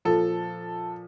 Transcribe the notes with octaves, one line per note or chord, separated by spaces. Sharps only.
A#2 F3 A4